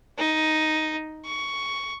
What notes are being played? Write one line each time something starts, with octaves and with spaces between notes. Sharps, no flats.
D#4
C#6